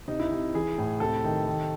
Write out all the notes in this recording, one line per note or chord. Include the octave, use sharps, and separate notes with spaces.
C3 D#4
E4
C3 D#4
E3 G#4
A2
C3 A4
D#3
D#3